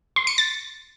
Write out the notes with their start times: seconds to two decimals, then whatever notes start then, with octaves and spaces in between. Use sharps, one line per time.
0.16 C6
0.27 C#7
0.38 A6